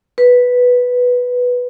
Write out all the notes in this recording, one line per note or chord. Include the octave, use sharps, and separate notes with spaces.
B4